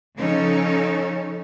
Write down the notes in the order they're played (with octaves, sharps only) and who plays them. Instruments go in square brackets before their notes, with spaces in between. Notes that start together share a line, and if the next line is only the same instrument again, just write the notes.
[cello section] C#3 F3 C#4 D#4 A4 C#5